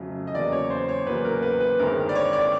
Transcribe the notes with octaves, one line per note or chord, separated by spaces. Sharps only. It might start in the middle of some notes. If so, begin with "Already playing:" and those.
Already playing: F2 C#3 F#3 A3
D#5
E2 C#3 F#3 A#3 D5
C#5
C5
C#5
E2 C#3 F#3 A#3 B4
A#4
B4
B4
G1 G2 D#3 G#3 C4 A#4
D5
C#5
D5